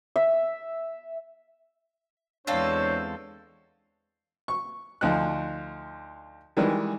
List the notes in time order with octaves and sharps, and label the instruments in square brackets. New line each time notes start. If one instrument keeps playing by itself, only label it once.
[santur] E5
[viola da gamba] E2 G#3 [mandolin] C4 F4 A4 [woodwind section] D4 C5 [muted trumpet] C#5
[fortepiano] C#6
D2 F3 D#4 F#6
D#3 E3 G3 G#3